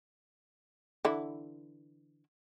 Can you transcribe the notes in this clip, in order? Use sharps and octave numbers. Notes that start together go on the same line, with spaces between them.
D3 E3 E4